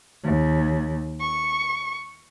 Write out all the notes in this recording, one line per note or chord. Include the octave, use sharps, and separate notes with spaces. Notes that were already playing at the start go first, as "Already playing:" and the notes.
D#2
C#6